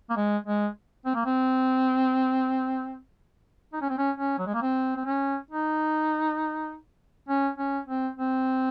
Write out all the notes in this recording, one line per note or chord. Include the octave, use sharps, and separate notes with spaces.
A#3
G#3
G#3
C4
A#3
C4
D#4
C#4
C4
C#4
C#4
F#3
G#3
A#3
C4
C4
C#4
D#4
C#4
C#4
C4
C4